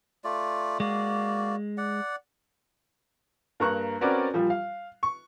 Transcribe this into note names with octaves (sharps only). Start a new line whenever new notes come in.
A3 F4 D5
G#3 A#3 F#4 D5
D5 F#5
G2 A#3 A#5 C#6 F#6
C4 C#4 F#4 A#4 B4 D5
A#2 F3 G3
F5
C#6